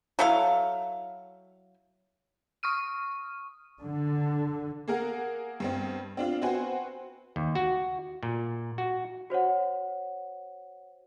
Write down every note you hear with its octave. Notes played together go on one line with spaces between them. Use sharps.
F#3 E4 A4 F5
C#6 D#6 F6 D#7
D3
A#3 G#4 A#4 F#5
G2 B3 C4
C4 D4 F4
C4 F#4 B4 C5 F#5 G#5
D#2
F#4
A#2
F#4
F#4 C5 C#5 F#5